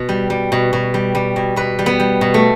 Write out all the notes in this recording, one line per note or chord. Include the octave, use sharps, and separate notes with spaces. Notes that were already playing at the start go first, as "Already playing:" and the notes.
Already playing: B2
G3
G3
B2
B2
G3
G3
B2
B2 B4
G3
B3
G3
B2
A3